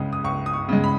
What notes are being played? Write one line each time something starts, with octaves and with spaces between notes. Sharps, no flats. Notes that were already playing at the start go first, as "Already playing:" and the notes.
Already playing: C#2 C#3 G#3 D#6
D#6
C#2 C#6
D#6
C#6
C#3 G#3
B5